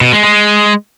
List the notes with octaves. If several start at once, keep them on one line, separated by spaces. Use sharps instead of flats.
B2
G#3
G#3